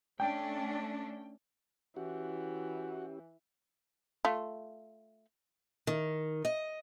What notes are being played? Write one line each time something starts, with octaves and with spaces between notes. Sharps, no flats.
A3 C#4 D4 G5
E3 C#4 E4 F#4 G4
A3 F4
D#3
D#5